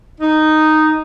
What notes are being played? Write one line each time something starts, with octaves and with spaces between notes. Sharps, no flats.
D#4